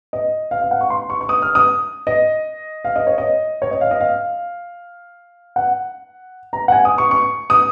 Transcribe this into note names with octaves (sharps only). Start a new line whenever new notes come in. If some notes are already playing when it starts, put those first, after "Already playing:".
D#5
F5
F5
F#5
C#6
C6
C#6
C#6
D#6
F6
D#6
D#5
F5
D#5
C#5
D#5
C#5
D#5
F5
D#5
F5
F#5
A#5
F#5
G#5
D#6
C#6
C#6
D#6